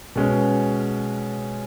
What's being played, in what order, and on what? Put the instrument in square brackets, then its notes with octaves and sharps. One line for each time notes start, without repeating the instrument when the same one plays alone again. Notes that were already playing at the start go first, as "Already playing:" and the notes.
[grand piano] B2 G#3 C#4